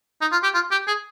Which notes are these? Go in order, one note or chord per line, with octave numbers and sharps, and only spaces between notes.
D#4
F4
G4
F4
G4
G#4